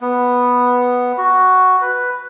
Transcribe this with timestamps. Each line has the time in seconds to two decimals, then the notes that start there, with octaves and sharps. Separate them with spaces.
0.01 B3
1.18 F#4
1.81 B4